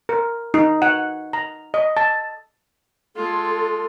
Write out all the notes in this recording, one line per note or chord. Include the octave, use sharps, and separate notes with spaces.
A#4
D#4
F#5
A#5
D#5
A5
G#3 F4 A4